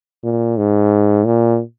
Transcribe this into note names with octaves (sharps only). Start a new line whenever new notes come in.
A#2
G#2
A#2